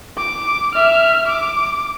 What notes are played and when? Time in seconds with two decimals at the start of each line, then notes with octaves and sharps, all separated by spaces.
0.18 D6
0.75 E5 F6
1.27 D6